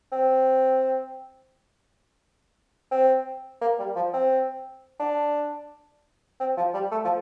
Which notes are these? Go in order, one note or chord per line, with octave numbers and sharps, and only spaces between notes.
C4
C4
A#3
G3
F3
C4
D4
C4
F3
G3
A3
F3